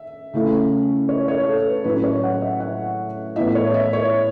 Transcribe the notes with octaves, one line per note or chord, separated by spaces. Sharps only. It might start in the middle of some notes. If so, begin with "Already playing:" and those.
Already playing: E5
C#3 A3 C#4 E4
C#5
C#5
A4
B4
A2 F#3 A3 C#4 E4 B4
C#5
F#5
E5
F#5
A2 E3 B3 E4 E5
C#5
E5
C#5